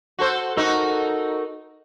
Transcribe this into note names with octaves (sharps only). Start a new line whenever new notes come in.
F#4 A4 C5
D#4 F#4 A4 A#4 C#6